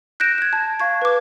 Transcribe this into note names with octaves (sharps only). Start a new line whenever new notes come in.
F#6 G6 A#6 D7 E7
F#6 G#6
A5
F5 C#6 G#6
B4 D6